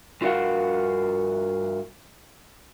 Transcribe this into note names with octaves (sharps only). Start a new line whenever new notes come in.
G2 F4 F#4 A#4 F5 F#5